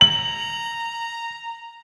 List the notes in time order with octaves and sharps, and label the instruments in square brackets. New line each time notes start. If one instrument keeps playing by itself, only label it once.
[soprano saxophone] A#5 [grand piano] F#7